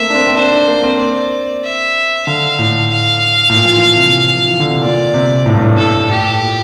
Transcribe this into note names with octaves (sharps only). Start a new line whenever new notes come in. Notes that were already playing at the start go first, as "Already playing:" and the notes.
Already playing: A3 A#3 C4 E5
D4
C4
C4
D4 C5
D4
A#3
C4
D5
E5
D3 F5
A2
F5
A2
A#2
F3
E3
C3
F3
E3
D3
C3
A#2 D5
C3
A2
G2
A2
A2 A4
A2 G4
A#2